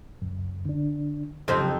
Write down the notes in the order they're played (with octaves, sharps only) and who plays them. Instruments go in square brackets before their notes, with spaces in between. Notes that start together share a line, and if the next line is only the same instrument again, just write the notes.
[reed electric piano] C#2 F#2
D3 D4
[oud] F2 C4 D#4 [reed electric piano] C#3 F#3 G4